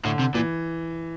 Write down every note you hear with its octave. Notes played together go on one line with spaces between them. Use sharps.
A2 D3
C3
A#2 E3